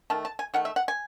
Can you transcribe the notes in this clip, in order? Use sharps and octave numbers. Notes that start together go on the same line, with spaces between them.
D#3 A3 A5
A5
G#5
D#3 A3 F#5
E5
F#5
G#5